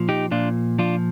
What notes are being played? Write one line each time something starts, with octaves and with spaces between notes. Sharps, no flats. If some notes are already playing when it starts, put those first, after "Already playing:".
Already playing: A#2 F3
D#4 G4
A#2 D4 F4
F3 D4 F4